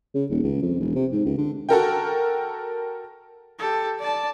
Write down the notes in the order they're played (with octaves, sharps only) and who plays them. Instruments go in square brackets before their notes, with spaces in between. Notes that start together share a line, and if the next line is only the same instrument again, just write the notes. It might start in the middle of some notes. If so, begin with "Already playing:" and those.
[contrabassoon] C#3
D#1
C#2
F2
E1
C3
G#2
C#2
D3
[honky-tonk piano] F#4 A4 A#4 G5
[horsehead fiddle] G4 A4
D5 A5